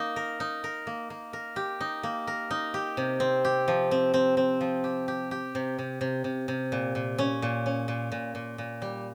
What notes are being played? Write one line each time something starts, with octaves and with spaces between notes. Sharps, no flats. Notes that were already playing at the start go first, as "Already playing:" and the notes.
Already playing: A#3 D#4
A#4
D#4
A#4
A#3
A#3
A#4
G4
D#4
A#3
A#4
D#4
G4
C3
C4
G4
F3
C4
C4
C4
F3
G4
G4
G4
C3
C3
C3
C3
C3
A#2
A#2
C#4
A#2
C#4
A#2
A#2
A#2
A#2
G3